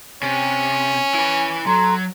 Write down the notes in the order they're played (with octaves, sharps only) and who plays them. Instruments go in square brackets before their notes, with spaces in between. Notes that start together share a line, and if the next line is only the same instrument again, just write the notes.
[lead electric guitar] C3 [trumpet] C#4
[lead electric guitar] E4 B4
[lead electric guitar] F#3 [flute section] A4 A#5 C6